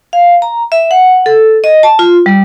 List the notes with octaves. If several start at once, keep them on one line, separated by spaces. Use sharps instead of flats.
F5
A#5
E5
F#5
A4
D#5
A5
F4
G3